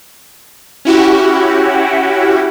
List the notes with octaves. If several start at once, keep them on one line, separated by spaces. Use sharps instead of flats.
C#4 E4 F#4 G4